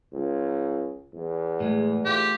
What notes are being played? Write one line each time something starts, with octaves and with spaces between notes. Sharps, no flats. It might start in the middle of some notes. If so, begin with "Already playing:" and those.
C#2
E2
A2 G#3
A3 F4 G4